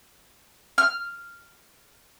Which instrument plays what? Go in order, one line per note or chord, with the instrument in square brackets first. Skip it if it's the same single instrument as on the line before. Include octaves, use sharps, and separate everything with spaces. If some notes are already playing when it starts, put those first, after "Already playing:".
[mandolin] F6